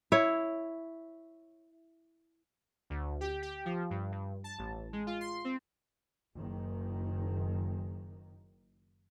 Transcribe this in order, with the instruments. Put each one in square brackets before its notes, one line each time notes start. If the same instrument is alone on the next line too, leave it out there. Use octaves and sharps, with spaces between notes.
[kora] E4 C#5
[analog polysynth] D2
G4
G4
F3
G2
G2
A5
A1
G#3
F4
C6
C4
[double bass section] F#1 D#3